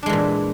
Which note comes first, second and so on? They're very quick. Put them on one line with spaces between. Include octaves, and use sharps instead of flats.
D4 G#3 E3 A#2